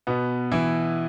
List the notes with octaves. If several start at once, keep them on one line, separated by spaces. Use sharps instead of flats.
B2 B3
E3 E4